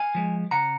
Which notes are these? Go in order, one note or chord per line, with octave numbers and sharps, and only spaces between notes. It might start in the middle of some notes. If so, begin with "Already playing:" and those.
Already playing: F5 G#5
F3 G#3
C#3 F#5 A#5